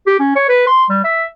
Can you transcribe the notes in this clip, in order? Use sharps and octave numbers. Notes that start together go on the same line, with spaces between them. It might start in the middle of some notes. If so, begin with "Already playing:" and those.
G4
C#4
C#5
B4
C6
G3
E5